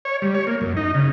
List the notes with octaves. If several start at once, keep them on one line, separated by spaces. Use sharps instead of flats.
C#5
G3
C#5
A#3
F#2
D#4
C#3